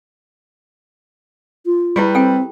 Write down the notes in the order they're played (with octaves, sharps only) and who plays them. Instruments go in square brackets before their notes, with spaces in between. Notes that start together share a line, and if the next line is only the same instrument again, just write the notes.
[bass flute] F4
[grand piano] G3 B4 [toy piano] E4 G4 G#4
[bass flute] C4 [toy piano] A4 G5